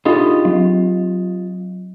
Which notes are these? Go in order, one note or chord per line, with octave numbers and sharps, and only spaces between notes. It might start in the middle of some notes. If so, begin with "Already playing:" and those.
D4 D#4 F4 G4 D#5
F#3